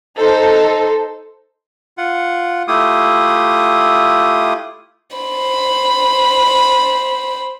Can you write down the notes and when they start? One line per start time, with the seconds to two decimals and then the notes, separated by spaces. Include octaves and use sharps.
0.18 D#4 A4 C5
1.98 F4 F#5
2.68 A3 E4 F4 G4 D#6
5.16 C5 B5